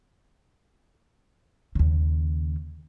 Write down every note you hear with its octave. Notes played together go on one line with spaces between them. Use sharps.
D#2 C#3